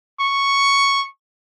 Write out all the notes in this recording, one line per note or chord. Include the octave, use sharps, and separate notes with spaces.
C#6